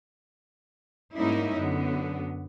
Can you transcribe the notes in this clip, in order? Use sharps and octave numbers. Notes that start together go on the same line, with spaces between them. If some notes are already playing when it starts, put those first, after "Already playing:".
G#2 G3 A#3 C#4 D#4 E4
F#2 D3 B3